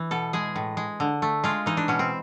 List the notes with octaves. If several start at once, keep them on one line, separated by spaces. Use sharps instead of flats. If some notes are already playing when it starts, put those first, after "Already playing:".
Already playing: E3
B2 A4
G#3 G#4
A2
G#3
D3
A3
G#3 F4
E3 D#4
D4
B2 C#4
C4